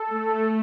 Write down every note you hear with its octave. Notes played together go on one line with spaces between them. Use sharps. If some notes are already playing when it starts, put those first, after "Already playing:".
Already playing: A4
A3